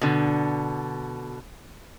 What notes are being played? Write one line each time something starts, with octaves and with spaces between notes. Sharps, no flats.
B2 D3